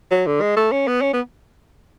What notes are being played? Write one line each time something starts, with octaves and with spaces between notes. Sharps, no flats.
F#3
D3
G#3
A3
C#4
B3
C#4
B3